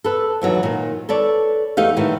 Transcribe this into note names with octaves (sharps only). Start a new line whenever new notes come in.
A4 B4
D#2 E3 F#3
A#2 D#3
A4 B4 C#5 D5
E2 A3 D#4 G4 F5
A2 D#3 E3